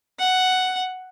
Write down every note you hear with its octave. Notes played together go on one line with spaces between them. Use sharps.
F#5